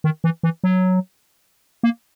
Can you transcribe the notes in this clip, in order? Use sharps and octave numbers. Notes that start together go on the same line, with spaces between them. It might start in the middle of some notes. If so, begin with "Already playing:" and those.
D#3
E3
E3
F#3
A#3